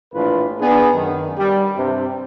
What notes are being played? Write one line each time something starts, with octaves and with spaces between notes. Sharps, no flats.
A#1 A2 E3 D4 F4 B4
B3 D4 G#4
F#2 D#3
G3
G2 C3